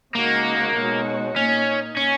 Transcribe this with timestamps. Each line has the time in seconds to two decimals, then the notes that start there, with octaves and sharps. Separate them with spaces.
0.15 C#3 G#3 A#3 D#4 F#4
0.75 B2 G#3 D#4 F#4 C#5
1.36 A#2 A#3 C#4 D#4
1.97 C#4